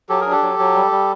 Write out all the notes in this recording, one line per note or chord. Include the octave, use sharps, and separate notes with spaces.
F#3 G4 A4
G#4 A#4
D4
G4 A4
F#3
F#3
G3
G3